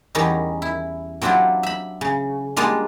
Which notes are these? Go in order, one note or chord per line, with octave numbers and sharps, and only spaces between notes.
E2 D#3 G3 C#4 D#4
E4
F#3 C4 D4 E4 F4 G4
E5 B5
C#3
G3 G#3 A#3 D4 F4